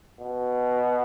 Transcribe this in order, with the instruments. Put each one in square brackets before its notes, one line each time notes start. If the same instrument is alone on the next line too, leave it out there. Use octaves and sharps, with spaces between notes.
[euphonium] B2